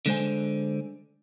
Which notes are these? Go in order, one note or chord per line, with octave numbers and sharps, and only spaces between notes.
D3 G#3 C5 G#5